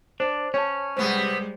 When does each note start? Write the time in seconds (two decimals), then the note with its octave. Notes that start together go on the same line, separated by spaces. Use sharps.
0.20 D4 C5
0.54 C#4 C#5 A5
0.97 C3 G3 G#3 B3 C5